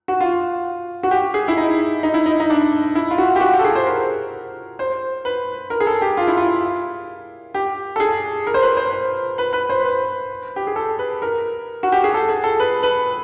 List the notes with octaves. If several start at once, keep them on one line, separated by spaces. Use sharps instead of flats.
F#4
F4
F#4
G4
G#4
E4
D#4
D#4
E4
D#4
D#4
D4
E4
F4
F#4
G4
F#4
G4
A4
G#4
C5
A#4
C5
B4
A#4
G#4
A4
G4
F4
E4
F4
G4
A4
G#4
A#4
C5
B4
C5
C5
B4
B4
C5
B4
G4
G#4
A4
B4
A#4
F#4
G4
G#4
A4
G#4
A4
B4
B4